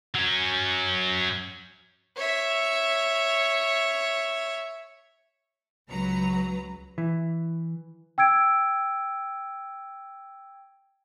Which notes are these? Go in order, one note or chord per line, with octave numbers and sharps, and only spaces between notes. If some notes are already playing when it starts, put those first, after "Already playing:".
F#3 C#4
C#5 E5
C#2 F#3 B4 A#5
E3
G5 E6 G#6 D7